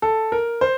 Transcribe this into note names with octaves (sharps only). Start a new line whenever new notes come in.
A4
A#4
C5